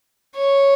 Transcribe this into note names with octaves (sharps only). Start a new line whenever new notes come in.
C#5